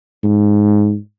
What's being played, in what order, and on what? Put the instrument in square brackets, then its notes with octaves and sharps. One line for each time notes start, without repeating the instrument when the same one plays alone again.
[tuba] G#2